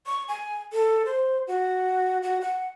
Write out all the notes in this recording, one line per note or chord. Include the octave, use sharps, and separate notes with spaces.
C#6
G#5
A4
C5
F#4
F#4
F#5